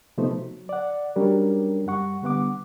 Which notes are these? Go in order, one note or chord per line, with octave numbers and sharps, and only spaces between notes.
C3 F3 A3 B3 D#4 C5
F#3
D5 F#5
F#3 G3 C#4 D4 G4 A#4
F#2 G3 F#5 C#6
D3 G3 B3 F#5 D6